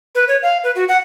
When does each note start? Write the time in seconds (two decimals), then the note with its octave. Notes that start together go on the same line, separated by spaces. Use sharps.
0.15 B4
0.28 C#5
0.43 F5
0.64 B4
0.75 F#4
0.88 F#5